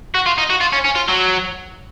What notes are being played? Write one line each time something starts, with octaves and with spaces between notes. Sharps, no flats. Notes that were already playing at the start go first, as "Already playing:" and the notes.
F#4
F4
D#4
F#4
F4
C#4
C#4
F4
F#3